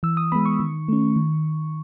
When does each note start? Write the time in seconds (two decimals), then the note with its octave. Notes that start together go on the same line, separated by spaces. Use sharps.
0.03 E3 E6
0.17 D#6
0.32 G#3 B3 B5
0.45 C#6
0.60 D#3
0.88 A3 C#4
1.16 D#3